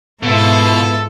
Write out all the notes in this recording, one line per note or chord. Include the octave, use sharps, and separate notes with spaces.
G#2 B2 B3 E4 F4 A4